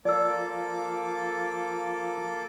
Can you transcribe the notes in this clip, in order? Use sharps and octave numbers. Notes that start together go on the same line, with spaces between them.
F3 A#3 F4 A4 D5 D6 E6